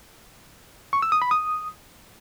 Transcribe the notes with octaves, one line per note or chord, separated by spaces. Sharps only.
C#6
E6
D#6
B5
D#6